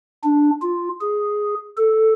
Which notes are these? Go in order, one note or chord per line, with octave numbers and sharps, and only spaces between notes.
D4
F4
G#4
A4